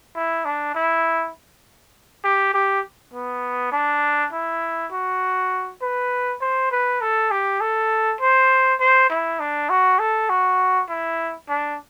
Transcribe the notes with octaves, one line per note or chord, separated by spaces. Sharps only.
E4
D4
E4
G4
G4
B3
D4
E4
F#4
B4
C5
B4
A4
G4
A4
C5
C5
E4
D4
F#4
A4
F#4
E4
D4